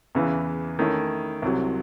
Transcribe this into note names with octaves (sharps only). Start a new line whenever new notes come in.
E2 C#3 E3
D#3 A3 C#4 E4
C2 C3 F#3